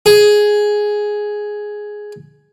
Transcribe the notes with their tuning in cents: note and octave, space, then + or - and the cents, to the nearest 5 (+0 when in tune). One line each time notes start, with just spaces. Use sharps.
G#4 +5